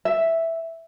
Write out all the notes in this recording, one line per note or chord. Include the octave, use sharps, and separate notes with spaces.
E5